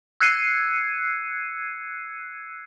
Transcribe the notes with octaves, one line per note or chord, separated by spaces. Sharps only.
E6 F#6 G#6 C7 C#7 D#7